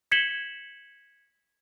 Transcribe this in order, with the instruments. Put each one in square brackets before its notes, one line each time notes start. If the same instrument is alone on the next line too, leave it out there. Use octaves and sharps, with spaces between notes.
[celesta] G#6 B6 C#7 E7 F#7 G7